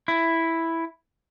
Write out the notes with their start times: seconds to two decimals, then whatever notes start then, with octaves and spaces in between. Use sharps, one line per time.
0.08 E4